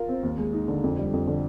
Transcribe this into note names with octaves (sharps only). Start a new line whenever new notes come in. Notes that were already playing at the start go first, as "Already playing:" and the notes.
Already playing: F4 A#4
C4
D#2
G#3
D#4
D3
F2
G3
F2
D3